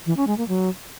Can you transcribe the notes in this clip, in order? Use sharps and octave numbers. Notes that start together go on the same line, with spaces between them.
E3
C#4
G#3
A#3
F#3